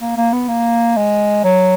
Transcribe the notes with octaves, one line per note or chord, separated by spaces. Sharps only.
A#3
A#3
B3
A#3
G#3
F#3